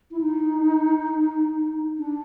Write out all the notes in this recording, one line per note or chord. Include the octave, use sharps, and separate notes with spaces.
E4
D#4
D4